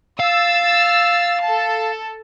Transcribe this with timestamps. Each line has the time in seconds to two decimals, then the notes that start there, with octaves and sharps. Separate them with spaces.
0.20 F5 E6 A6
1.43 A4 A5